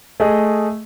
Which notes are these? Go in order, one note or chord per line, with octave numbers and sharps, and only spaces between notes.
A3 G#4 D#5